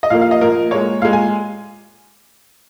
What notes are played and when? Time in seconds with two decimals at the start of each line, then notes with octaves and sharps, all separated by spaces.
0.03 D#5
0.10 A#2 F3 A#3 F5
0.21 F5
0.31 D#5
0.41 A#2 F3 A#3 A#4
0.71 A#2 G#3 C#5
1.02 A#2 G#3 F5
1.13 G#5